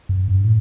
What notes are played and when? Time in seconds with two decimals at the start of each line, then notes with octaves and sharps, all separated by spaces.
0.09 F#2
0.28 G2
0.44 A2